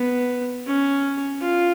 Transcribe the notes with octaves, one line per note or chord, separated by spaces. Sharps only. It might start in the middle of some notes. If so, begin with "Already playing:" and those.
Already playing: B3
C#4
F4